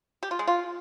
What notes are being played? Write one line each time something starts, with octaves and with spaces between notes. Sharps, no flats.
G4
F4
G#3
F4